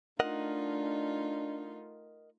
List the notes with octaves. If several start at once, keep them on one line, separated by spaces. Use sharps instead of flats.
A3 D4 D#4 F4 A#4 D#5 F#5